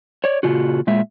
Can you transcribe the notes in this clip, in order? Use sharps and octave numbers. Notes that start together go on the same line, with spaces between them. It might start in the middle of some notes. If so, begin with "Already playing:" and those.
C#5 D5
A#2 C#3 F4 F#4
A#2 G#3 E5